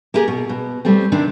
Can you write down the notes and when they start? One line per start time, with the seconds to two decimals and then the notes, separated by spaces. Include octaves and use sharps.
0.14 A#3 E4 G4 G#4 A#4
0.28 B2
0.49 B2
0.85 G3 A3 C4
1.12 C3 D#3 C4 D4